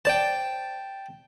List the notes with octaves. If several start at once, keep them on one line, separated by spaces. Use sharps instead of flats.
C5 D5 G5 A5